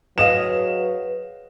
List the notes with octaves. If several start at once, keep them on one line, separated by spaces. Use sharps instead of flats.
F#3 G#4 B4 D#5 F5 E7